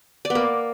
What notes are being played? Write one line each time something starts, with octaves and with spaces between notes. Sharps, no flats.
D5
B3
A#3